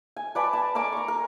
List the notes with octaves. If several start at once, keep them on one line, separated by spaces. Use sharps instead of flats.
G#5
B4 D5 G#5 A5
A5
A#4 D5 G#5 D6
A#5 C#6
A#4